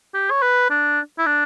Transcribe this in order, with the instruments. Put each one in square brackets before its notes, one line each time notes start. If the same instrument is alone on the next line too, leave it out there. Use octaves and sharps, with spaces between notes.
[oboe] G4
C#5
B4
D4
E4
D4